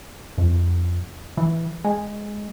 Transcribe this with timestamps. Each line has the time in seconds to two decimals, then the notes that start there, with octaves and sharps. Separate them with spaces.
0.38 F2
1.37 E3
1.84 G#3